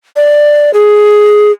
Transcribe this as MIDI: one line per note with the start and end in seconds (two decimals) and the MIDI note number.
0.16 0.71 74
0.74 1.51 68